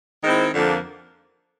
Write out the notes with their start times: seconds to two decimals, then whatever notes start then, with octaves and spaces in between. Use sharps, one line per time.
0.23 D#3 G#3 C4 E4
0.53 F2 D3 F3 A#3 D4